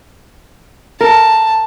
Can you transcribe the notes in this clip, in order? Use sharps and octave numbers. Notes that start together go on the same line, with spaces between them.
A#4 A5